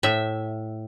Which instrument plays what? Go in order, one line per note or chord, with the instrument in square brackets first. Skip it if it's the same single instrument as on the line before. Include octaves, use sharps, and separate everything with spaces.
[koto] A2 E5